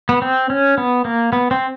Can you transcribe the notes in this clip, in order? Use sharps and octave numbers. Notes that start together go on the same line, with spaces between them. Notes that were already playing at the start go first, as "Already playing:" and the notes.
B3
C4
C#4
B3
A#3
B3
C4